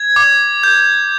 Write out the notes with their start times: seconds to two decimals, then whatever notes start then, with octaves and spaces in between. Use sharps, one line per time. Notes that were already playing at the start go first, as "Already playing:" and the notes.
Already playing: G#6
0.16 D6
0.63 G6